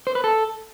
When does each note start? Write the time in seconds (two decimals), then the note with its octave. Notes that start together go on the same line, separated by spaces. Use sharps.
0.07 C5
0.15 B4
0.24 A4